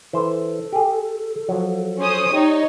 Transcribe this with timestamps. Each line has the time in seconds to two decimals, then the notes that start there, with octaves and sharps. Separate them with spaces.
0.13 E3 A4 C5
0.72 G4 G#4
1.48 F3 F#3
1.99 C#4 C5 D#6
2.33 D#4 G4 C#5 D5